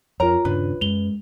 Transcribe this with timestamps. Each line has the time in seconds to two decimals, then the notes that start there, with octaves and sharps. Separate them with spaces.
0.20 F2 F4 A#4 C#5 A#5
0.45 D#1 G2 C#3 D4 B4
0.81 F#2 G#3 F7 G7